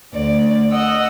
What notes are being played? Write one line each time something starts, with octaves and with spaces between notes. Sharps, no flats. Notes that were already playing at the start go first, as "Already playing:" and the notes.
D2 D5
D#5 F#5 E6